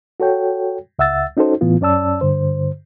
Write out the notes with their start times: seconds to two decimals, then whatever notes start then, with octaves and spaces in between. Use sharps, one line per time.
0.20 F#4 A4 C#5 G5
0.99 C#2 E5 F#5 E6 A6
1.37 C#4 D#4 F#4 A4 C5
1.61 A2 E3 B3 F4
1.81 F#2 C#4 D5 A5 E6
2.21 G2 D3 C5